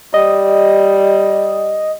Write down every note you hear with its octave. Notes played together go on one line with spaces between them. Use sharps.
G3 D#5